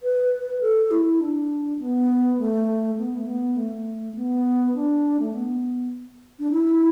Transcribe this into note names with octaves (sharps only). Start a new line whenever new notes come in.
B4
A4
E4
D4
B3
A3
B3
A3
B3
A3
B3
D4
A3
B3
D4
E4